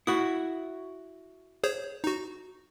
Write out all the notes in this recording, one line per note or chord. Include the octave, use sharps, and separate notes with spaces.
E4 F#4 D#6
G#4 C5 C#5
D#4 F#4